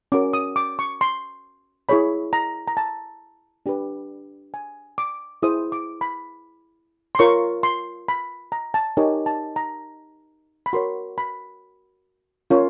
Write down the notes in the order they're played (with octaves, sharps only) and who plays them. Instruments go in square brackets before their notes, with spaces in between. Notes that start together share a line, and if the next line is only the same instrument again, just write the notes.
[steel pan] C#4 F#4 A#4 D6
D#6
D6
C#6
C6
E4 G#4 C#5 B5
A#5
A#5
A5
D4 G4 B4
G#5
D6
E4 G#4 C5 D#6
D6
B5
C6
F4 A#4 C#5 C#6
C6
B5
A#5
A5
D#4 G4 A#4 C#5 G#5
A5
A#5
B5
F#4 A#4 C#5 C6
B5
C#4 F4 A#4 C#5